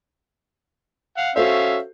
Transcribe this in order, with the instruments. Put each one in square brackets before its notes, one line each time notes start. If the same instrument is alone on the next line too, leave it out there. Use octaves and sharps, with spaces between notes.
[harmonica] F5 F#5
[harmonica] C#4 E5 F5 [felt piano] F#4 A4 C5